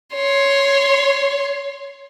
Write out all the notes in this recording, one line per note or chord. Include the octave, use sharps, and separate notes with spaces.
C#5 C6